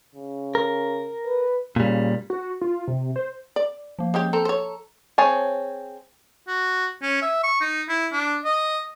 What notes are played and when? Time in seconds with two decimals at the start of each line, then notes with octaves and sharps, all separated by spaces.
0.15 C#3
0.55 A#4
1.26 B4
1.76 A#2 C#3 G3
2.30 F#4
2.61 F4
2.87 C3
3.16 C5
3.56 D5
3.99 F3 A#3
4.14 G#3 C#4 G4
4.33 C4 A4 A5 A#5
4.45 C5 C#5
5.18 C4 G#4 C#5 G#5 A5
6.48 F#4
7.02 C#4
7.22 E5
7.44 C#6
7.61 D#4
7.89 E4
8.12 D4
8.45 D#5